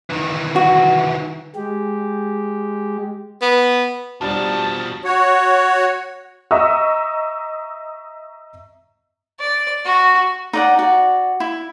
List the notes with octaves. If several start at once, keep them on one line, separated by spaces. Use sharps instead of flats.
D#3 E3
F#4
G#3 G4
B3
B2 F3 G3 D4 F#4 A5
F#4 C#5
D#5 E5 A#5 C#6 D#6 E6
D5
F#4
D#4 D5 F#5
F#4 D5
E4